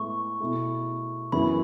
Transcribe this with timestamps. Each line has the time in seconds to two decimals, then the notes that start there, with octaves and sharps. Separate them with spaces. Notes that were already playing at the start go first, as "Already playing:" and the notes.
Already playing: A2 G#3 B3 E4 A4 C#6
0.40 B2 A3 E4 G#4
1.32 F#2 E3 B3 E4 G#4 B5